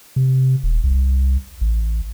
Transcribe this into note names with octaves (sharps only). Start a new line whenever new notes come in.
C3
D#1
C2
A1